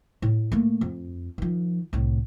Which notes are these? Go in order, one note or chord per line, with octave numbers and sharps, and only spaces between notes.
A2
A3 A#3
F2
D#3 F3
C2 A2